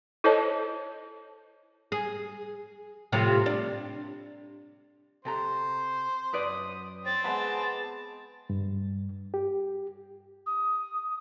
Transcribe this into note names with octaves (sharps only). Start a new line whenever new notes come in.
E4 A4 C5 C#5 D#5 A5
G#4
A2 C3 F3
D4
C3 A4 C5 A#5
F#2 B4 D5 D#6
C4 C#5 A6
G#3 B3 F#5 A5 B5 D6
G2
G4
D#6